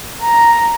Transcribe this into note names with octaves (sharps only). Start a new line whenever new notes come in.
A#5